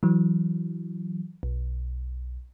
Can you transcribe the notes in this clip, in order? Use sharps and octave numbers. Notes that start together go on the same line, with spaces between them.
E3 F#3
B1